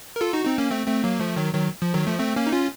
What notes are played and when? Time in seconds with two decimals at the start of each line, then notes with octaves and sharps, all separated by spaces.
0.16 A#4
0.21 F4 A4
0.33 D#4 F#4
0.45 C4 D#4
0.58 A#3 C#4
0.71 A3 C4
0.87 A3 C4
1.04 F#3 A#3
1.20 F3 A3
1.36 D#3 F#3
1.53 D#3 F#3
1.82 F3
1.94 D#3 F#3
2.07 F3 A3
2.19 A3 C4
2.36 A#3 C#4
2.47 D#4
2.52 C#4 F4